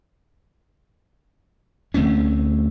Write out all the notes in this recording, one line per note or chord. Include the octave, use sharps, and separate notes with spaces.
D2 A3 C4 C#4